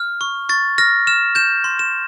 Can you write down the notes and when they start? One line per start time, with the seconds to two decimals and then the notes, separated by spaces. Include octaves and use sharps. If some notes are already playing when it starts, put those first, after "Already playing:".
Already playing: F6
0.21 C#6
0.49 C#6 A6
0.78 F6 A#6
1.07 F6 E7
1.35 G6 E7
1.64 C6
1.79 E7